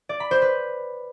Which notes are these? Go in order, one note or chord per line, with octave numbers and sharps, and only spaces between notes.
D5
B5
C5
B4